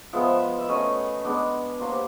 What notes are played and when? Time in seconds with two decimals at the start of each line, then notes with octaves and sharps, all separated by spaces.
0.13 F3 G#3 B3 E5
0.59 E5
0.69 F#3 A3 C#4 D#5
1.24 G#3 B3 D4
1.80 F#3 A#3 D4 C5
1.92 G4